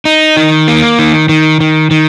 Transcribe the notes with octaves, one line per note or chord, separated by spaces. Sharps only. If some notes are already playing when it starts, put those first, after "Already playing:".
D#4
D#3
A#3
D#3
D#3
D#3
D#3